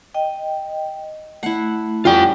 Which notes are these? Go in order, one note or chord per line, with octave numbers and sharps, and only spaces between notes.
D#5 G5
A3 E4 F#5
F#3 G3 C#4 F4 G5